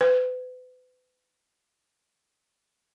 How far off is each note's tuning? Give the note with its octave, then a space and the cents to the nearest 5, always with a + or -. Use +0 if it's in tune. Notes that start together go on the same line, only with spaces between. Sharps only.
B4 +40